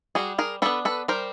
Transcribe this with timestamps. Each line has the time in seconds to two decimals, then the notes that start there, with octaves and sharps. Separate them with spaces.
0.15 G3 F#4 G#4
0.38 G#4 A#4
0.62 B3 D4 A4 B4
0.85 A4 B4
1.08 G3 A#4 C5